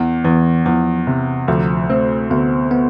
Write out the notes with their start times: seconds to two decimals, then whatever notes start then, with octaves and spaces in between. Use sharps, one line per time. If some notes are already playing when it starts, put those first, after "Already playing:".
Already playing: E2
0.24 E2 E3
0.66 E2 F3
1.07 C3
1.48 D2 F3
1.89 A3 C4
2.30 D2 B3
2.71 B3